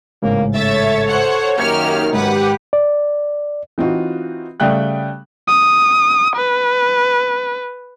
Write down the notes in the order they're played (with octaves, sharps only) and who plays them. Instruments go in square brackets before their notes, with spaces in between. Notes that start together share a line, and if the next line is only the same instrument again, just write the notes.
[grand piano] A1 G#2 C#3 [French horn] A#3
[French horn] A4 [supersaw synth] C#5 [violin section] E5 A6
[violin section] C5 F#5
[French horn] F#2 [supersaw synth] D#3 [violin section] A#3 G4 F6 [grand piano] G6 G#6 C#7
[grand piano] G#2 [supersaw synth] G4 [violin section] B4 F#5
[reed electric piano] D5
[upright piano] E3 C4 D#4 F4 F#4
C#3 G3 A3 G5 F#6
[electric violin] D#6
B4